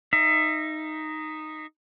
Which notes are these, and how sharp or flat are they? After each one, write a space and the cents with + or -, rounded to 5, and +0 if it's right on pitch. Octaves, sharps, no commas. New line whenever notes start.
D#4 -5 E5 +20